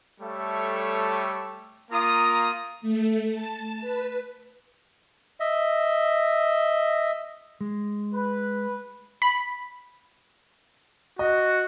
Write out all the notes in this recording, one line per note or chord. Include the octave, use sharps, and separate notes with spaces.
G3 A3 A4 C#5 E5
A#3 F4 A#5 D#6
A3
A5
B4
D#5 E5
G#3
B4
B5
F#4 D#5